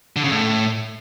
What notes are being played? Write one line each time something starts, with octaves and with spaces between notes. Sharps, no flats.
D3
C#3
A2